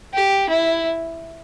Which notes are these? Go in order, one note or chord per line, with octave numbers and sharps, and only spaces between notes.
G4
E4